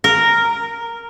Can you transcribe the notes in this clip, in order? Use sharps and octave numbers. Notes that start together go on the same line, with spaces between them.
A#4